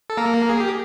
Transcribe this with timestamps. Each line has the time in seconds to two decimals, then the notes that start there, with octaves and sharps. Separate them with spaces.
0.10 A4
0.17 A#3 A#4
0.49 G#4
0.60 G4